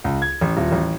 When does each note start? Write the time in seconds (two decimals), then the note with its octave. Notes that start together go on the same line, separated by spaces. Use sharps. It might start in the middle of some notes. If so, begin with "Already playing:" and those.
0.04 C#2
0.22 G#6
0.41 A1
0.57 D#1
0.72 A1